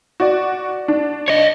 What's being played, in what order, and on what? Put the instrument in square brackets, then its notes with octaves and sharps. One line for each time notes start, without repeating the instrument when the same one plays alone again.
[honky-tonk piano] F#4 D5
D4
[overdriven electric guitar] C#5 D#5